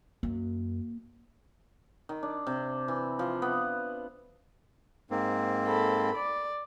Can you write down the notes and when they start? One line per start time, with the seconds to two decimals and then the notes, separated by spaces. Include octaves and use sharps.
0.23 F#2 A#3
2.09 D#3
2.23 D4
2.47 C3
2.88 E3
3.19 F3
3.42 B3
5.10 G#2 A#3 C4
5.67 A4 B5
6.16 D5